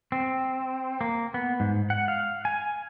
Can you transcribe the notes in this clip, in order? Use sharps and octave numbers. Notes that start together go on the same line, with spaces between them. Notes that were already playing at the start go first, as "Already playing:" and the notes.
C4
A#3
B3
G#2
F#5
F5
G#5